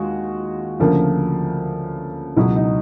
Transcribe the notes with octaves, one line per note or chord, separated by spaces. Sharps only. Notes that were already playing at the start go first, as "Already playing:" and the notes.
Already playing: D#2 G#3 F4 F#4
D2 C#3 F3 A#3
C#2 B2 F#3 E4
D#4